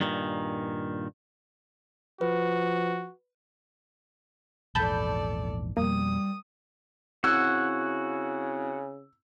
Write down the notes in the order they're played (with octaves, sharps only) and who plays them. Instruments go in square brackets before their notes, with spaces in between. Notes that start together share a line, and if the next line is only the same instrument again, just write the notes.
[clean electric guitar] G2 A#2 D#3
[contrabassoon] F3 [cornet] F#4 [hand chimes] B4
[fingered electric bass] A#1 E2 G#2 [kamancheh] A4 D5 [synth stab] A5 B5 G6
[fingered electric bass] F2 B2 [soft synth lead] G3 [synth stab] A#3 [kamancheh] D#6
[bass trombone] C#3 [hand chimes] C4 E4 G#6 [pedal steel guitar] F#4 F#5 [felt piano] E6